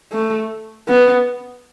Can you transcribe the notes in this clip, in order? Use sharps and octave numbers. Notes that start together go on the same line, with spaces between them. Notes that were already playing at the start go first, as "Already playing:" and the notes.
A3
B3